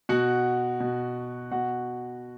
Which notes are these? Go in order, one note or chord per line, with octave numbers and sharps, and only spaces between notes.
B2 F#4 F#5
B2
B2 F#4 F#5